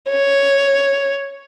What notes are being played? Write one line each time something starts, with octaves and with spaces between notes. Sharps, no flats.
C#5